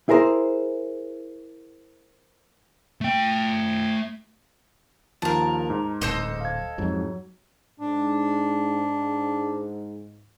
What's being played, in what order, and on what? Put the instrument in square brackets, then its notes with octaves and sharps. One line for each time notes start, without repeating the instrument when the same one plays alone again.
[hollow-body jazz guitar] E4 G#4 A#4 C5
[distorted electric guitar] A3 G5
[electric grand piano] D#2 F3 [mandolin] A#4 A5
[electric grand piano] G#2
[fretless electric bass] D1 [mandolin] A4 C5 D#5
[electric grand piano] F5 G#6
[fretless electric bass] F2 G#2 [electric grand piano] F#3
[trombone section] G#2 [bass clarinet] D4